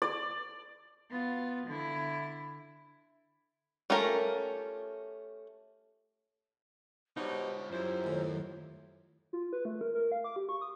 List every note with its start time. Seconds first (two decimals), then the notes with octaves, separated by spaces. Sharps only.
0.02 D5
1.10 B3 F4
1.68 D3 E4
3.90 A3 C#4 F4 G4 A#4
7.17 B2 G3 D#4 F4 C5 C#5
7.71 F#2 G3 E4 F4 C5
8.04 D#2 A2
9.33 F4
9.53 B4
9.65 A3
9.81 A#4
9.95 A#4
10.12 F5
10.24 D6
10.36 G4
10.49 C#6
10.61 D#6